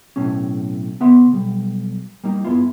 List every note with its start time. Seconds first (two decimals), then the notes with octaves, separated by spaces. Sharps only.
0.16 B1 A2 C3 C#4
1.00 C#3 B3 E5 B5 C6
1.33 B1 G3
2.24 G3 A#3 D#4
2.44 G2 G#3 B3 E4 F4